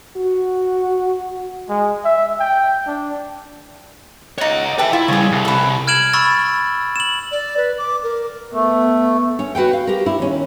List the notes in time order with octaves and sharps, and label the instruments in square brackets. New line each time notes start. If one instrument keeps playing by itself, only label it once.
[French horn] F#4
[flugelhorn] G#3
E5
G5
D4
[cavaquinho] D#4 F#5 [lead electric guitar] C#5 D#5
[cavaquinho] G4 A4 [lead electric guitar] B4 E5
[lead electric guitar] E4 [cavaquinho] F4
[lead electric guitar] C#3 G3 [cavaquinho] G#4 C#5
[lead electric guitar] C2
[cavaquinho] A4 B4
[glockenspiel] F6 G#6 D7 E7 F#7
B5 C#6 E6 A6
E7 F#7
[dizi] D5
B4
D6
A#4
[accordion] A3 [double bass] B3
[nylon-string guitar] C#4
F#4 B4 F#5 G5
F5
G4 A#4
E4
D#2 C#4